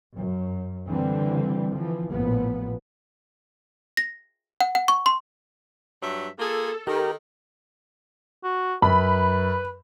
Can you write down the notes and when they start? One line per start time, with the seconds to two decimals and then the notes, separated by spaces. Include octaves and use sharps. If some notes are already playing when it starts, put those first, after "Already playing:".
0.15 F#2
0.88 D3 E3 G3 C4
1.75 E3 F3
2.12 A1 A#2 F3 B3
3.97 A#6
4.61 F#5
4.75 F#5
4.88 C#6
5.06 C6
6.02 G2 F#3 E5
6.40 A#3 F4 G#4 A4
6.87 D#3 G4 A#4
8.44 F#4
8.82 F#2 B4 B5